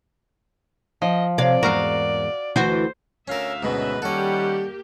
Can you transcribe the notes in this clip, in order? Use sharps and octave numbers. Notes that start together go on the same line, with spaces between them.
F3 D#5
C3 C#5 D5 F5
E2 G#2 F#4 A#4 F5
D2 E3 F#4 C5
D2 C#4 A#4 E5 F5
D2 G#2 B2 C#4 B4
D#3 G3 A#3 C#4 G4 A4 D5 F#5